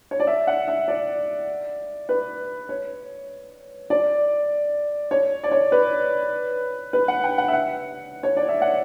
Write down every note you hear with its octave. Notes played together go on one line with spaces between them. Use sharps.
C#5
D5
E5
F#5
E5
D5
B4
C#5
D5
C#5
D5
C#5
B4
B4
F#5
G5
F#5
E5
F#5
C#5
D5
E5
F#5